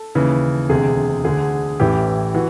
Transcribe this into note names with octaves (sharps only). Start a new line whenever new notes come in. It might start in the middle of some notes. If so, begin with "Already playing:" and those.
Already playing: A4
D#2 C#3 E3
E1 D2 C3 G#4
D2 D3 G#4
A1 A2 E3 G4
E3 F#4